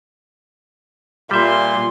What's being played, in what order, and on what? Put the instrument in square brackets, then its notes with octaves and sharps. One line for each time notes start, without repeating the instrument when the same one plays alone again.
[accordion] A#2 [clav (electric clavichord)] G3 E5 [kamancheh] C6